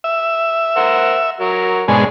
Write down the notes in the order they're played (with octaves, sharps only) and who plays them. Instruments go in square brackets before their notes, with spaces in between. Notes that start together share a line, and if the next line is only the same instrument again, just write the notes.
[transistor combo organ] E5
[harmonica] A#4 C5 F#5
F#3 A#4
[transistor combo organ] G#2 B2 G#3 [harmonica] C#4 D4 G#4